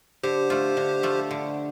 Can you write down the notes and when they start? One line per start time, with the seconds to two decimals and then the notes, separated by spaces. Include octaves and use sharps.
0.23 D3 G4 C5
0.50 A3 F4
0.77 D3
1.03 A3 F4
1.31 D3